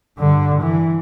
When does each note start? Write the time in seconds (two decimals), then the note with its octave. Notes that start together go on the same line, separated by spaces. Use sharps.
0.18 G2 D3
0.62 E3